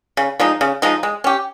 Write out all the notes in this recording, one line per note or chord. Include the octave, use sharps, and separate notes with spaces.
C#3
F3 G#3 D#4
C#3
F3 G#3 D#4
G#3
C#4 G4